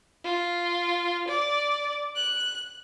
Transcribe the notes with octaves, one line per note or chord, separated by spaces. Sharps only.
F4
D5
F#6